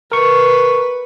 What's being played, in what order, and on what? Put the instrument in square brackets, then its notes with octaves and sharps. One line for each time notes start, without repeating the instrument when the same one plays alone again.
[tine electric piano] A#4 C#6 [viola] B4